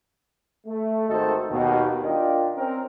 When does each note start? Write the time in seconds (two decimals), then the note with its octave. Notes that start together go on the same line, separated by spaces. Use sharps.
0.67 A3
1.09 G#1 D#3 F#4 A4 C5 D#5
1.51 D#2 B2 D#3
2.04 D4 F4 A#4 D#5 G5
2.56 C4 C#4 A#4